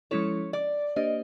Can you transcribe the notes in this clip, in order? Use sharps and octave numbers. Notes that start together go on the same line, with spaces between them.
F3 G#3 C#4 E4 A4 C#5
D5
A#3 D4 G4 C5 D#5